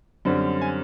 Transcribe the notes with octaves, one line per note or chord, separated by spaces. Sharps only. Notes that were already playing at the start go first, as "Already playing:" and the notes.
F#2 D3 G3 C4
G#5